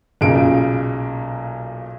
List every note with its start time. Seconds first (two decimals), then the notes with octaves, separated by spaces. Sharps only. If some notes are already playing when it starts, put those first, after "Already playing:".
0.21 B1 A#2 C#3 G#4 D7